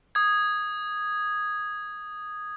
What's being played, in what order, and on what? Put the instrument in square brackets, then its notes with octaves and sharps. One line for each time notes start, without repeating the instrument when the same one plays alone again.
[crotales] D#6 G#6